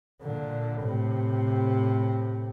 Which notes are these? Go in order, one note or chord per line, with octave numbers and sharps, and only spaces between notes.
A#2 D3
A2 C3